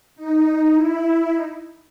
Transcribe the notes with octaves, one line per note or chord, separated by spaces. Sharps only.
D#4
E4
D#4